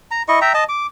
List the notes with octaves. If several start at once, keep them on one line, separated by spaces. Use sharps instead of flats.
A#5
E4 D#5 C#6
E5 G5 A#5
D#5 A5
D6